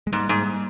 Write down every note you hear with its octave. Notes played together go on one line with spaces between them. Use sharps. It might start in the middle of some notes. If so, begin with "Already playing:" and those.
G#3
G#2 G3 A#3
G#2